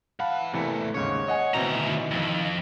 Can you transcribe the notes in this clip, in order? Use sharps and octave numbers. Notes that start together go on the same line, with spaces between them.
E3 F5 F#5 A5 B5
E2 C3 E3 A3 A#3
D#2 G#2 C#3 C#5
D#5 F#5 G#5
D2 B2 D#3 E3 C4 A#5
F2